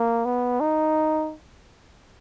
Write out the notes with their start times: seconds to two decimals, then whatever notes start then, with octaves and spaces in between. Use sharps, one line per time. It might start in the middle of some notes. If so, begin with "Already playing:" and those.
Already playing: A#3
0.25 B3
0.60 D#4